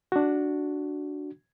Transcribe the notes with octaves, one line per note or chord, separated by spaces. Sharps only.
D4 F#4